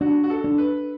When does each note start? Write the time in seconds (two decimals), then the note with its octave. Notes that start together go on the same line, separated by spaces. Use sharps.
0.01 D4 F#4
0.24 F#4
0.30 A4
0.44 D4
0.58 B4